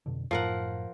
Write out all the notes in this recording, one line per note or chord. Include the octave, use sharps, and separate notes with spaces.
F2 B2 D3
F#2 A2 F3 A#4 F#5